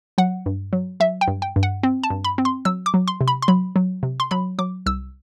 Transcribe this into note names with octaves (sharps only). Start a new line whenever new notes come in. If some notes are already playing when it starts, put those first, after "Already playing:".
F#3 F#5
G2
F#3
F#3 E5
G5
G2
G5
G2
F#5
C4
A5
G2
B5
C4
C6
F#3 E6
D6
F#3
C6
C3
B5
C6
F#3 B5
F#3
C3
C6
F#3 B5
F#3 D6
C2 E6